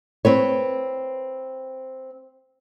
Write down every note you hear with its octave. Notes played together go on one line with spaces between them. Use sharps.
C4 B4 C#5